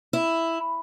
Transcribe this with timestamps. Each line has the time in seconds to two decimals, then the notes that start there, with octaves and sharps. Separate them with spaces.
0.13 E4